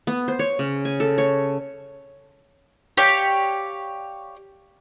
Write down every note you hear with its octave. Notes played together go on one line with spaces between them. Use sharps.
B3
C5
C#5
C#3
G#5
A4
C#5
G4 C#5 D5 F5